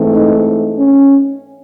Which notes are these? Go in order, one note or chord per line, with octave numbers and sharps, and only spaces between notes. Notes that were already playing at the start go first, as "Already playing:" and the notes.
Already playing: G#2 E3 A3 C4
D#4
C#4